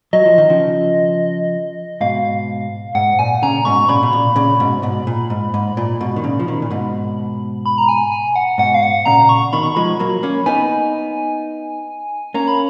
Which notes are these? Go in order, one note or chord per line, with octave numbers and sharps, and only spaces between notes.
F#3 D#5
F3
D#3
C#3 F3
G#2 B2 F5
G#2 F#5
A#2 G#5
A#2 C#3 A#5
G#2 B2 C#6
A#2 C#3 B5
B2
A#2
A#2 C#3
G#2 B2
G#2 B2
A#2
G#2
G#2
A#2
G#2 B2
D#3
A#2 C#3
F3
B2 D#3
A#2
G#2 B2
B5
A#5
G#5
G#5
F#5
G#2 B2 F#5
F5
F#5
A#2 C#3 A#5
C#6
B2 D#3 B5
C#6
F3 G#3 B5
F#3 A#3
A#3 C#4
B3 D#4 G#5
A#3 C#4 A#5
B5